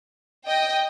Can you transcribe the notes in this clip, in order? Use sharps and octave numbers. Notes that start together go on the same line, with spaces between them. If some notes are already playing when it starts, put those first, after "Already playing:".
D#5 G5